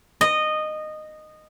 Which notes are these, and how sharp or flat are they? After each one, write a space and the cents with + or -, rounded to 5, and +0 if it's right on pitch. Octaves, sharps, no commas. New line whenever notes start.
D#5 -15